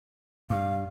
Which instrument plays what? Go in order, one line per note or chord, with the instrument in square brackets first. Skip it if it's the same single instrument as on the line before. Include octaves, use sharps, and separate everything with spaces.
[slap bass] G2 [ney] F5